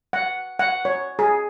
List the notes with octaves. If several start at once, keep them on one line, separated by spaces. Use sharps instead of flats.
F#5
F#5
C#5
G#4